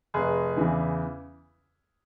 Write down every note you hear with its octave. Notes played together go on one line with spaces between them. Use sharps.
F1 G#4
E2 C#3 E3